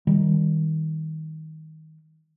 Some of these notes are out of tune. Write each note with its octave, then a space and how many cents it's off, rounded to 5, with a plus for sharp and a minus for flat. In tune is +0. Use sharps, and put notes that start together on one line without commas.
D#3 +20 G3 +15